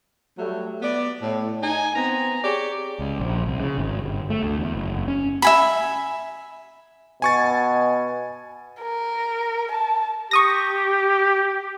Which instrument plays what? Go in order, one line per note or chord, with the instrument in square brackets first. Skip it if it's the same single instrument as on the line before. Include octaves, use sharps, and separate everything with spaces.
[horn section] F#3 G3 A3
B3 D5
A2
D#4 G#5
B3 C4 A#5
G4 G#4 C#5 D5
[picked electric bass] C#2
A#1
C2
C#3
G#1
G1
A3
D2
E2
F#1
C#4
[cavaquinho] E5 G#5 B5
[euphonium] B2 [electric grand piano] G#5 C#6 A6
[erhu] A#4
A5
[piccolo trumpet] G4 [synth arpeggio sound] C#6 D#6 A#6